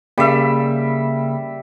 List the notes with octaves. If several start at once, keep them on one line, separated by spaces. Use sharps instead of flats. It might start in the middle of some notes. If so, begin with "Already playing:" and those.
C#3 G3 A#3 E5